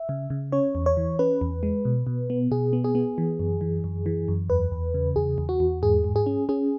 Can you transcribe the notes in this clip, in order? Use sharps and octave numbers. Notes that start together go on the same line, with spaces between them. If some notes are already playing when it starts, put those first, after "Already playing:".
Already playing: E5
C#3
C#3
C#4 C#5
E2
C#5
E3
C#4 B4
E2
G#3
B2
B2
B3
B2 G#4
B3
G#4
B3
E3
F#2
E3
F#2
E3
F#2
E2 B4
E2
C#3
E2 G#4
E2
F#4
E2
G#2 G#4
G#2
G#4
C#4
C#4 G#4